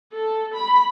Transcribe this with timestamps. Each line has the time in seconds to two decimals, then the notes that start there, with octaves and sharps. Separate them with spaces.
0.12 A4
0.53 B5